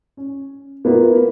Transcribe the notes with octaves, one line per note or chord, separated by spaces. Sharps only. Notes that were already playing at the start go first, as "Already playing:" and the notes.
C#4
A#3 B3 E4 F4